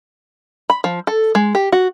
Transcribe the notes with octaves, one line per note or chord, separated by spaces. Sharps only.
B5
F3
A4
G#3
G4
F#4